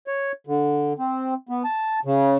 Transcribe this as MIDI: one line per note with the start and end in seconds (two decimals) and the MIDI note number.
0.07 0.32 73
0.47 0.93 50
0.99 1.34 60
1.49 1.63 59
1.64 1.99 81
2.05 2.37 49